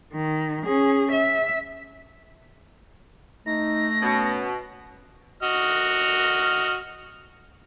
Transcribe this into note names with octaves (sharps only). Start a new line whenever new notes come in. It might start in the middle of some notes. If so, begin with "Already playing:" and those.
D#3
C#4 G#4
E5
A3 D#4 A#6
B2 C#4
F#4 D#5 F6